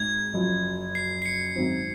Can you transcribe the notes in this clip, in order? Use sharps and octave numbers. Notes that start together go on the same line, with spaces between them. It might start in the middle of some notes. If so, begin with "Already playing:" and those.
Already playing: G#1 G#2 G#6
F#1 F#2 F3
C7
C7
C#7
G#1 F#2 D#3 F#3 C4